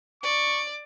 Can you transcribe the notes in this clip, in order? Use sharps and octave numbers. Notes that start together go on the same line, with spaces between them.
D5 C#6